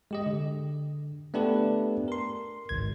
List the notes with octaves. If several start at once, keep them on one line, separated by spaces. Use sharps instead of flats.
G#3 G4 D#5
D3
A3 B3 D4 G4 A4 B4
A#4 C6
G#1 C#2 G#6